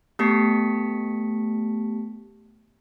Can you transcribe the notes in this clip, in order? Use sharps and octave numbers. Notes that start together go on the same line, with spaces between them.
A3 B3 G4 A5 B6 C#7